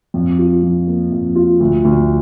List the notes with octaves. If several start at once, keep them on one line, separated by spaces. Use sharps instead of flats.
F2
F4
F3
A#3
F2
F4
D2
D2